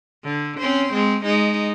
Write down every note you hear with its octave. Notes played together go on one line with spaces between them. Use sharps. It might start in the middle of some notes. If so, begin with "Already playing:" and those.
D3
C4 C#4 C5
G#3 C4
G#3 D#4